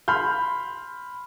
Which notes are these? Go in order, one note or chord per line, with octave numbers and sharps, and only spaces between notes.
B5 C6 F6 G6